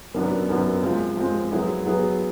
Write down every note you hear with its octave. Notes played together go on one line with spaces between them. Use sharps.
F#2 D#3 F#3 B3 D4
F#2 D#3 F#3 B3 D4
F3 G#3 C4
F3 G#3 C4
F#3 B3 E4 G#4 B4
F#3 B3 E4 G#4 B4